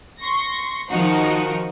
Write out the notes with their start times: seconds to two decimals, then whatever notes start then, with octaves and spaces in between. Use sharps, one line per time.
0.20 C6 C#6 A#6
0.89 D#3 F3 D#4 F#4